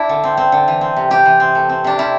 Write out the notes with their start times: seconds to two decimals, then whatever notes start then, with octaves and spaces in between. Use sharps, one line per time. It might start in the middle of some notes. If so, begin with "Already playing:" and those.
Already playing: D4 E4
0.09 D3
0.24 C4
0.37 C4
0.52 D3
0.68 E3
0.81 C4
0.97 C3
1.10 C3 G4
1.25 E3
1.40 C4
1.55 A3
1.69 C4
1.84 C3 D4
1.98 C3 E4